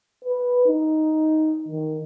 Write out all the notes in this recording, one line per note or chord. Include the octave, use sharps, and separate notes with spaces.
B4
D#4
D#3